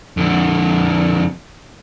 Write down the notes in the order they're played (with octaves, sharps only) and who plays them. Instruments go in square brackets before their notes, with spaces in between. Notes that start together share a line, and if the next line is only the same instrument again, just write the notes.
[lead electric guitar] F2 D3